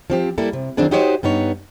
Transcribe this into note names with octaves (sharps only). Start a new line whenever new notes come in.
F3 C4 G4
G3 A#3 E4 A4
C3
D#3 F#3 C4 D4 E4 G#4
D#4 F#4 G4 C5 C#5 D#5
G2 B3 D#4 C#5